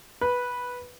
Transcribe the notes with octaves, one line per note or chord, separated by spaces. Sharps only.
B4